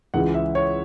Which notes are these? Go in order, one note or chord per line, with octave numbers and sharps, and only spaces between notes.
C#2 C#3 E3 G#3 F#5
E5
C#5